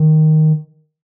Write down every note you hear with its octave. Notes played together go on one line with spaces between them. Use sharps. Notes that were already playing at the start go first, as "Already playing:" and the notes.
Already playing: D#3